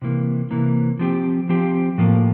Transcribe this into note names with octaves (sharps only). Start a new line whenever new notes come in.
C3 E3 A#3
C3 E3 A#3
F3 C4 G4
F3 C4 G4
A2 F3 A#3